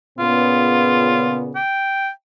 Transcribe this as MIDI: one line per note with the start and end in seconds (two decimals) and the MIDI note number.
0.19 1.58 46
0.19 1.58 49
0.19 1.58 59
0.19 1.41 65
1.55 2.10 79